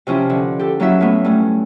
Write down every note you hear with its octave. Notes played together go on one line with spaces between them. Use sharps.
C3 F3 C#4 E4 G4
D3
G4 A4
F#3 A#3 C#4 E4 F#4 E5
A2 A3 B3
G2 A3 C#4